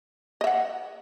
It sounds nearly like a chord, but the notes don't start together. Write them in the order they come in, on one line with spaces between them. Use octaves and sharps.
D#5 E5 F#5